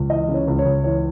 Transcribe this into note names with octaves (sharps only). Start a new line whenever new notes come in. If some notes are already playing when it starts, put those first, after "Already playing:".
Already playing: C#2
E3 D#5
C#3
C#5
C#2
C#5
C#2
E3 C#5